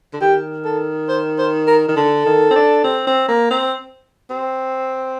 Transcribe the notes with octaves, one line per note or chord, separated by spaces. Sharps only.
D3
D#3 G4
A4
C5
C5
A#4
D#3
D3 A4
D#3
C4
D4
C4
C4
A#3
C4
C4